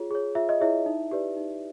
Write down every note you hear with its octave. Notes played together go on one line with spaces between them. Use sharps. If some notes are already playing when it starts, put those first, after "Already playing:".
Already playing: F4 G#4 C#5
G#4 C#5
F4 E5
D#5
E4 G#4 C#5 E5
D#4
G4 B4 D5
D#4